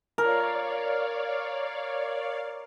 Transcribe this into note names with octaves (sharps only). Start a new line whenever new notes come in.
A#4 C#5 D5 F5